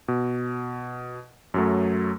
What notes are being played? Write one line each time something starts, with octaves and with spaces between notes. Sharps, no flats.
B2
F#2 F#3 A3